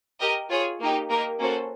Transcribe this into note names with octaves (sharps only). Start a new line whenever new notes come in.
G4 A#4 D#5
F4 G#4 C#5
A#3 D#4 G4
A#3 D#4 G4 A#4
A#3 C#4 F#4 A4 C5